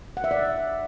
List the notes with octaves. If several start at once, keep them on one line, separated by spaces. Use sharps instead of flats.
F#5
E5
D5